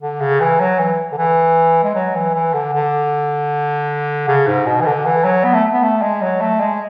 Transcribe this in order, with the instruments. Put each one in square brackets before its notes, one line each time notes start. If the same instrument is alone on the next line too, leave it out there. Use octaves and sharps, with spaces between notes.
[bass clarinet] D3
C#3
E3
F#3
E3
D3
E3
G#3
F#3
E3
E3
D3
D3
C#3
G#2
B2
E3
D3
E3
F#3
B3
A3
B3
A3
G#3
F#3
A3
G#3